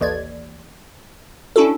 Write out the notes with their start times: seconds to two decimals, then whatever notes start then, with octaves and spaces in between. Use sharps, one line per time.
0.01 A1 D#2 D5 G#6
1.56 C#4 D4 E4 F#4 A4